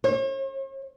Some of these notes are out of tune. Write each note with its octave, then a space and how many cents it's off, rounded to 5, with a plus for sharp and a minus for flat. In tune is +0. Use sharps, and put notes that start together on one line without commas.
C#5 -45